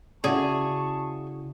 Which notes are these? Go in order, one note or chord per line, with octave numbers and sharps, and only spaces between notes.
C#3 E4 F#4 G#4 D5 A5 C#6